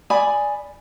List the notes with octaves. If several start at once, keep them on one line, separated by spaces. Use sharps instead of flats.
D5 G#5 B5 D#6